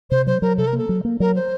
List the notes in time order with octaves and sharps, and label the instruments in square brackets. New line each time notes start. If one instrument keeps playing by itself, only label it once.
[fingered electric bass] C3 [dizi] C5
[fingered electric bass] F#3 [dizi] C5
[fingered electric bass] F#3 [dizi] A#4
[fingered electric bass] C3 [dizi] A4
[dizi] A#4
[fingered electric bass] A#3 [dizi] A4
[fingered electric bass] F#3
A#3
[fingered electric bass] F#3 [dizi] A#4
[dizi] C5